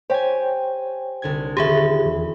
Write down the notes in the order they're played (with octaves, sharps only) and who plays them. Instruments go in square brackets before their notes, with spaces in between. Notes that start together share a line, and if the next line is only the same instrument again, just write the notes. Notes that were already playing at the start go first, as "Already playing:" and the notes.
[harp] G4 G#5 [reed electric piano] C5 C#5 G5
[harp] C2 D3 G#6
[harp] D#1 B5 [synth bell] G4 G#4 E5
[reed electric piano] E2